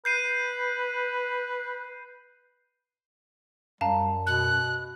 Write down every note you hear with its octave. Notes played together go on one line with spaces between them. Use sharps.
B4 G6 C7 D#7
F#2 G3 F5 A5 A#5
B2 F#6